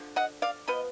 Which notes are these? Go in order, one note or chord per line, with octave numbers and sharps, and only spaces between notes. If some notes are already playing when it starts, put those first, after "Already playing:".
Already playing: D3 F3
D#5 F#5
D5 F5
F3 B3 B4 D#5